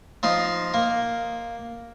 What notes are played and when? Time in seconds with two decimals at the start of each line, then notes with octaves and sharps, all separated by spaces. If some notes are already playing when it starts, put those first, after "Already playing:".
0.23 F3 D#4 C6
0.74 A#3